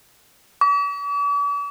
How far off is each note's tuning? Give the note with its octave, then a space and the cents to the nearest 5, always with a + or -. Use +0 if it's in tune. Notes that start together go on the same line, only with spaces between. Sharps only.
D6 -45